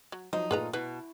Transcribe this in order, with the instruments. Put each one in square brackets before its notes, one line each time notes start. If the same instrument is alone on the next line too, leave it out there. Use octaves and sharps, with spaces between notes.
[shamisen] F#3
[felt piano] F3 F#3 [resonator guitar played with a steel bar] D#4 [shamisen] C5
[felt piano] A#2 A3 F4 [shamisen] G#4 B4 A#5
[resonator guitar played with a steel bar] B2 [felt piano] E4 [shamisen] B4